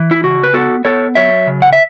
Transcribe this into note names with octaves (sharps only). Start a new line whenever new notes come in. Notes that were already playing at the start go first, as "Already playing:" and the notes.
Already playing: E3
E4
C#3 F#4
B4
B3 F#4 A4
B3 A4 C#5
F#3 C#5 E5
C#3
F#5
E5